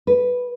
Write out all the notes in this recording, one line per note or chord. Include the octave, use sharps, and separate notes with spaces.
B4